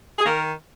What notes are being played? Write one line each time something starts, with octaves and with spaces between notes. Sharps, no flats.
G#4
D#3 A#3 A#4